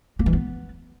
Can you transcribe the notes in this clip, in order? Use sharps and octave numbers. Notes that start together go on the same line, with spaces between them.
A#3
E3
B3